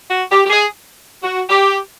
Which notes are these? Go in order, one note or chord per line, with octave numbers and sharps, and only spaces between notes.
F#4
G4
G4
G#4
F#4
G4